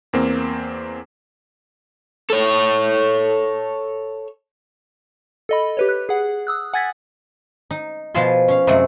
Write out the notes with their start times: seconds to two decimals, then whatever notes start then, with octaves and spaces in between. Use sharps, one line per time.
0.13 E2 A#3 C4
2.30 A4 C#5
5.49 A4 D#5 B5
5.77 G4 B4 C#5
5.89 F#6
6.09 G#4 F#5
6.47 D#6 E6 F#6
6.73 F#5 G#5 G#6 A6 B6
7.71 D#4
8.15 B2 F3 F4 G#4 A5 C6
8.48 C#4 F5
8.67 F#2 C3 F#3 G#3 A3